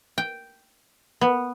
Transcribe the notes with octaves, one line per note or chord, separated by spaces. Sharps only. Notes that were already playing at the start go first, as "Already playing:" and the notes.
G5
B3